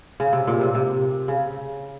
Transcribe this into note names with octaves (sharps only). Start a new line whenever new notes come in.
C#3
C3
A#2
C3
C3
C#3